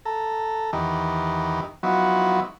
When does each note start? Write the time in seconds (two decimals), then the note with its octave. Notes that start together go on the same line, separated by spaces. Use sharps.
0.05 A4 A#5
0.73 E2 D#3 E3 D#4 G4
1.83 F3 F#3 B3 D#4 E4 F#4